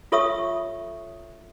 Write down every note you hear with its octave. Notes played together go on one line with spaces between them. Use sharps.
F4 A4 C#5 E5 C#6 D#6